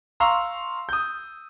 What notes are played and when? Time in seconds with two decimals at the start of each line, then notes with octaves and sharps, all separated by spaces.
0.20 F5 A#5 C6 C#6 E6
0.89 D#6 G6